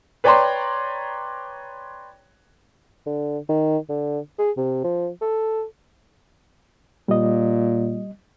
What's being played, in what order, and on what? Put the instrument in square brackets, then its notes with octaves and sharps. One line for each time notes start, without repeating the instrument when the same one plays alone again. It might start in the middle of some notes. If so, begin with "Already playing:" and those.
[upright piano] B4 C#5 D5 G5 A#5 C6
[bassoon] D3
D#3
D3
G#4
C3
F3
A4
[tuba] A#2 [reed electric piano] G3 D#5